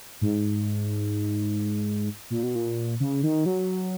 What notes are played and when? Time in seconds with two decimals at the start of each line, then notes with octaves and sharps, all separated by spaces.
0.21 G#2
2.30 A#2
2.43 B2
2.55 A#2
3.00 C#3
3.23 D#3
3.46 F#3